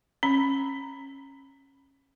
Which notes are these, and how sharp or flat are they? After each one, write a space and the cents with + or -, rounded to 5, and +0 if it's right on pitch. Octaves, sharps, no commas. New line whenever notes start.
C#4 -25 B5 +0